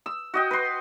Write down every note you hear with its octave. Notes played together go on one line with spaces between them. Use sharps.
E6
F#4 D#5 G5
B4 C6